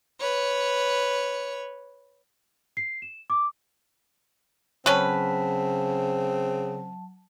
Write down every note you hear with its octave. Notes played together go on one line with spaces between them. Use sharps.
B4 C#5
C7
E7
D6
C#3 F#3 C4 C#4 B4 A5